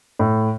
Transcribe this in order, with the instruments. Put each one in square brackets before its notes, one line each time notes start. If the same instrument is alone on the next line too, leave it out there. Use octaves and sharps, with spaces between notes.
[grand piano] A2